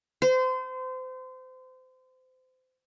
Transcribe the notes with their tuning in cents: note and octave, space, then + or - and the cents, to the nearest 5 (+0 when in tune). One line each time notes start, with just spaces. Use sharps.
C5 -30